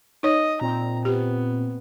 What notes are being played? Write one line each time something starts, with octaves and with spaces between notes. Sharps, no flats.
D#4 C#5 D#5
A#2 C4 A#5
B3 G4